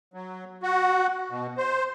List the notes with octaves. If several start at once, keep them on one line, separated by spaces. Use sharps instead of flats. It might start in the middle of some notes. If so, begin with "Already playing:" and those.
F#3
F#4
B2
C5